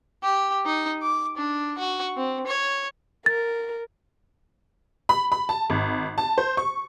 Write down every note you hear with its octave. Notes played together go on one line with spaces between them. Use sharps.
G4
D#4
D6
D4
F#4
C4
C#5
A#4 A6
B5
B5
A5
G#1
A5
C5
C#6